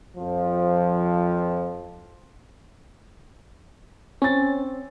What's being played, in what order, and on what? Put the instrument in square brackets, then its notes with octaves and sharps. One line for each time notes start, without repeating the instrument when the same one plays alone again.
[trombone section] F2 F3
[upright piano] C4 A6 [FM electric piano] C#4